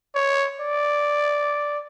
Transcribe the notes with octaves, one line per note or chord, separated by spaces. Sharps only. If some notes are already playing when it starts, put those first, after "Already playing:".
C#5
D5